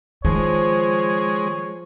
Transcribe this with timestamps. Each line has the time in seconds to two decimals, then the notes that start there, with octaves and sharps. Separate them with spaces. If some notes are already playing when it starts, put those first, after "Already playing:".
0.25 D#3 F3 G#3 C#5